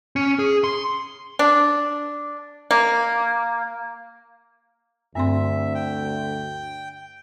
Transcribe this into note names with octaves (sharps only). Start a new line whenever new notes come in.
C#4
G#4
C6
D4
A#3
D2 G2 C4 E5 C6
G5